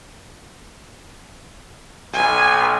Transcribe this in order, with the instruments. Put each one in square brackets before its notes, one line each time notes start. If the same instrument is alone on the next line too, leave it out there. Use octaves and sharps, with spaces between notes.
[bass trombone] B1 [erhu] G#5